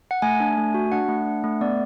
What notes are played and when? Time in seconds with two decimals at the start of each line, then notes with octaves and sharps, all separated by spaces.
0.11 F#5
0.22 A3 G#5
0.40 D4
0.57 A3
0.74 F#4
0.92 D4 F#5
1.08 A3
1.26 D4
1.44 A3
1.61 B3 D5